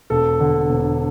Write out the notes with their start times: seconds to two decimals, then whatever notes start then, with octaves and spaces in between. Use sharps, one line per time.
0.10 E1 A4
0.40 D3
0.69 E1